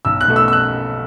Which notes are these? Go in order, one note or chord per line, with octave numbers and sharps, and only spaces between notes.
B1 E6
F#6
B2 A3
E6
E6
F#6